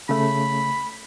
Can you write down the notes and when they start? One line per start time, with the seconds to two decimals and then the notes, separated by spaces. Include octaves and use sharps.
0.09 C#3 A3 B5